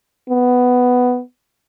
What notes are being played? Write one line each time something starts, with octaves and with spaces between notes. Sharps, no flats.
B3